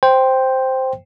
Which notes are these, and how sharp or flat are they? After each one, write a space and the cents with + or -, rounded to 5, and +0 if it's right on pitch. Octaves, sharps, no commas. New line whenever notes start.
C5 +0 G5 +0